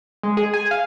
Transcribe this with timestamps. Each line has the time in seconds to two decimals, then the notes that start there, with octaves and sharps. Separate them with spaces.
0.23 G#3
0.37 G#4
0.54 G#5
0.71 F5